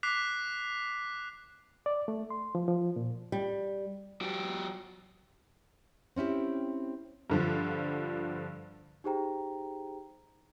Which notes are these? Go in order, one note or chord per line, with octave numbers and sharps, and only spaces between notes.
D6 F#6 B6 C7 F7
D5
A3
C6
F3
F3
A#2
G3
F#3 G4
C4 C#4 E4 G4
G2 D3 F3
D#4 G4 G#4 C5 G5 A#5